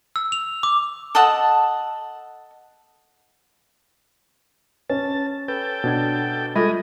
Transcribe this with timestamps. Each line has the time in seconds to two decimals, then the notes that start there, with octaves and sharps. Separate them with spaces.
0.16 E6
0.32 F7
0.63 D6
1.15 A4 D#5 F#5 A5
4.90 C#4 A5
5.48 A4 B4 G5
5.84 B2 D4 G#6
6.56 G3 G#3 F4 A4 D#5 B5